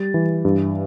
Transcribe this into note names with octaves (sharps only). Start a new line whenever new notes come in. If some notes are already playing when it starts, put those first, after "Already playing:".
Already playing: G3 A6
E3
G2